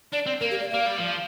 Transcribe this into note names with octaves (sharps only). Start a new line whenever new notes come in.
D4 D5
C4
A#3 A#4
G4
D5
A#3 F5
G3
F3